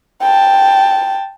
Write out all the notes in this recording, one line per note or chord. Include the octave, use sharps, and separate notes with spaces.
G5 A5